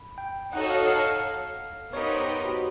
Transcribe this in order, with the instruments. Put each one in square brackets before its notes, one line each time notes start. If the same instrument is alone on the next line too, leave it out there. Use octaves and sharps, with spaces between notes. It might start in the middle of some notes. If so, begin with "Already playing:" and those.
Already playing: [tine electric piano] B5
G5
[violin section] D#4 F#4 A4 C#5 [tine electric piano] F#5
[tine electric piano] F5
F5
[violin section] B3 D#4 G4 A#4 [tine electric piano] C#5
[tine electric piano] C5
B4
F#4